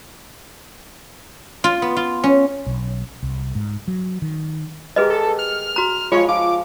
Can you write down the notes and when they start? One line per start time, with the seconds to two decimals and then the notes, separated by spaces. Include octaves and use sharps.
1.64 F4
1.82 B3
1.97 F4
2.24 C#4
2.66 B1
3.23 C2
3.55 G#2
3.88 F#3
4.22 D#3
4.96 G#3 G4 G#4 A#4 B4 D#5
5.10 A4
5.39 F6
5.76 F#4 A#5
6.12 F3 G#3 F4 C#5 F5 C#6
6.29 F3 D6